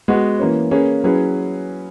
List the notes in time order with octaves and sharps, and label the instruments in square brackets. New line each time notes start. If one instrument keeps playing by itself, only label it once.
[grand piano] G#3 B3 F#4 B4
E3 A#3 C#4
A#3 C#4 G#4 B4
F#3 C#4 E4 G#4 B4